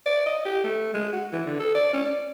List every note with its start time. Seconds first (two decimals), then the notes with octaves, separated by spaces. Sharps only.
0.06 D5
0.26 D#5
0.45 G4
0.64 A3
0.94 G#3
1.13 F#4
1.32 E3
1.46 D3
1.60 A4
1.75 D5
1.93 C#4
2.06 D5